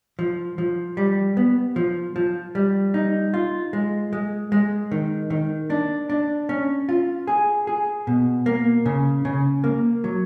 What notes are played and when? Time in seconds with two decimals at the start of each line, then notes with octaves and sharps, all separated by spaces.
0.19 F3
0.58 F3
0.97 G3
1.37 B3
1.76 F3
2.16 F3
2.55 G3
2.94 D#4
3.34 F4
3.73 G#3
4.13 G#3
4.52 G#3
4.91 D#3
5.30 D#3
5.70 D4
6.10 D4
6.49 C#4
6.89 F4
7.27 G#4
7.67 G#4
8.07 B2
8.46 A#3
8.86 C#3
9.25 C#3
9.64 A#3
10.04 F#3